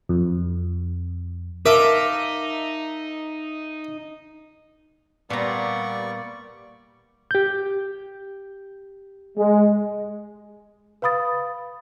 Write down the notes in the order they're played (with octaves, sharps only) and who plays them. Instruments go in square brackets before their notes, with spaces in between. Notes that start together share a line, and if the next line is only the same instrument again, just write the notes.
[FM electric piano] F2
[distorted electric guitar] D#4 [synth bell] A#4 [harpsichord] E5 A5 [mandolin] F5 D6
[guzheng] A#2 A#5 [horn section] G3 [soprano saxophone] B3 [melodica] D5 C#6
[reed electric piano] G4 G6
[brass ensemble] G#3
[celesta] B4 F5 B5 D#6 A6